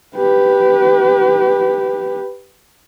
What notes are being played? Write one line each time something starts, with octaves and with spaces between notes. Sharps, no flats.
G4 B4